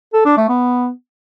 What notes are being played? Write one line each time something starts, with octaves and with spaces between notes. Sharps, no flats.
A4
D4
A3
B3